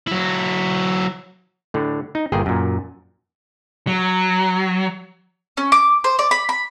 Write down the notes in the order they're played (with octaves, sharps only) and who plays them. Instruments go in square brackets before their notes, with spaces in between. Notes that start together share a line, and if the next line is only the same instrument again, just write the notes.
[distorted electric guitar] F#3 E4
[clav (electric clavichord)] A2 D3
D#4
G1 A#2 G#4 G5
F#2 A#2
[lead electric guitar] F#3
[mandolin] C#4
D6
C5
D5
B5
B5